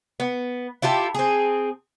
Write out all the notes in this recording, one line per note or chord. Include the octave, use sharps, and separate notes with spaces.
B3
E4 F4 G4 A4
C4 G#4